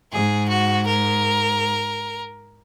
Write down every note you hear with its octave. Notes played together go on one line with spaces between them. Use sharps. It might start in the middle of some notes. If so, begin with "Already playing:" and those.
G#2 G#4
F#4
A#4